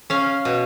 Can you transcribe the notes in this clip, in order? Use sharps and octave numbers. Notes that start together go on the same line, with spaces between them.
C#4 F5
B2